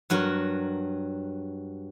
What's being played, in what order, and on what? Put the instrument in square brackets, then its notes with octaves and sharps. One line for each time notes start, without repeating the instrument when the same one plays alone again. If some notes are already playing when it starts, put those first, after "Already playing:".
[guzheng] G2 F#3 F#4 A#4